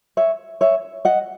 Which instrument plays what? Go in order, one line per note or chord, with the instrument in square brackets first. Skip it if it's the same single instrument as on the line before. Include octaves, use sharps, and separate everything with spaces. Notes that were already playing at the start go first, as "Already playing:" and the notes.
[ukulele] C#5 E5
C#5 E5
D#5 F#5